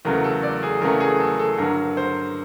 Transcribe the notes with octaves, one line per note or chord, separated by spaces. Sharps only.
E2 C#3 F#3 A3 A#4
A4
D5
G#4
E2 C#3 F#3 A3 A#4
G#4
A4
A4
G2 D3 F#3 A#4
C5